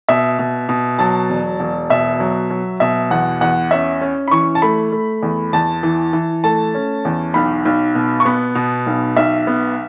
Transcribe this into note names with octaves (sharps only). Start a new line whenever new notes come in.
B2 E5
B2
B2
F#3 A5
E1
E1
B2 E5
F#3
F#3
B2 E5
E2 F#5
E2 F#5
C#4 E5
C#4
B5
E3 C#6
A5
A3 B5
A3
E2
E2 A5
E3
E3
A3 A5
C#4
E2
B1 B5
B1
B2
C#6
B3 B5
B2
B1
B1 E5
B3